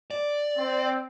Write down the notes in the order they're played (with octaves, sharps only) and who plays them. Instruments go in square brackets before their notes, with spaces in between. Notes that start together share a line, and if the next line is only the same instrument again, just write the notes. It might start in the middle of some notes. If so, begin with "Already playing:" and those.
[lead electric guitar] D5
[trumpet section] C4